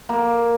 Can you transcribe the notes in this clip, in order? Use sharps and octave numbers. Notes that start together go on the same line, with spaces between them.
A#3